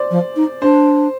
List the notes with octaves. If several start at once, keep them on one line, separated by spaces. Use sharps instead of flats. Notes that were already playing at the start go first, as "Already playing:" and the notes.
Already playing: C5 D5
F3
D#4
D4 C5